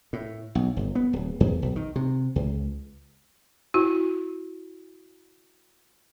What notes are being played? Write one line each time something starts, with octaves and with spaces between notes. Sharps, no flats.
A2
B1
G1
B3
D1
E2
B1
D#3
C3
C#2
E4 F#4